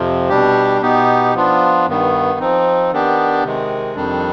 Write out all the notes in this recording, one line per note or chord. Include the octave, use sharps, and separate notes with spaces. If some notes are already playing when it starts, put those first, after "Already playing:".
Already playing: F2 C3 F3
B2 G3 D4 G4
B2 B3 D#4 G4
F3 B3 D4 F4
G2 D#3 B3
F3 C4 D#4
D#3 B3 D4 G4
C3 D#3 G#3
F2 D#3 G3 D4